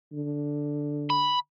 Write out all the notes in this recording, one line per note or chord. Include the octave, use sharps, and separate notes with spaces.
D3
B5